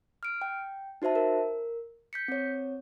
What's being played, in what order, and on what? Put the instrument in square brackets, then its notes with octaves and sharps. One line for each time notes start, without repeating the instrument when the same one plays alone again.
[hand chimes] F6 D7
G5
D#4 F#4 C5 E5 A5
A#4
G6 B6 C#7
C4 C#5